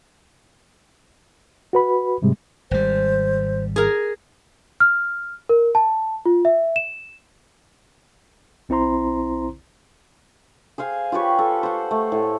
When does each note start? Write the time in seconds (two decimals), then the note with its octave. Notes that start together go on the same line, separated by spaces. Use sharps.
1.73 F#4 B4 B5
2.22 G#2 C3 G3 G#3
2.71 G#1 G3 C5
3.76 G#4 A#4
4.80 F6
5.49 A#4
5.75 A5
6.26 F4
6.45 E5
6.76 E7
8.69 B1 C4 E4 C5 A#5 C6
10.78 G#4 C5 F5 G#5
11.12 F4 G4 B4 C#5
11.39 A4
11.63 C5 F#5
11.91 A3
12.12 A2